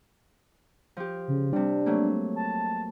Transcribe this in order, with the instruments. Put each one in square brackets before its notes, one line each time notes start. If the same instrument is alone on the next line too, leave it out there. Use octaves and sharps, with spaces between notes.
[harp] F3 G4
[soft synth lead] C#3
[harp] C3 G3 [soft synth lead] D4
[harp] F#3 A3 A#3
[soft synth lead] A5